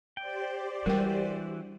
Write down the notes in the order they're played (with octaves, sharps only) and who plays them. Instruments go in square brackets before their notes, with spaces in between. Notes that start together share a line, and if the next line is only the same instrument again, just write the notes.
[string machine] G4 C5 D5 [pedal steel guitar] G5
[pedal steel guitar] E3 F#4 [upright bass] G3 D4 [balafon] A#4 G5